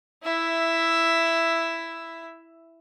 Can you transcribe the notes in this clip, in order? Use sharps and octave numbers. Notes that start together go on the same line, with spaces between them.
E4 E5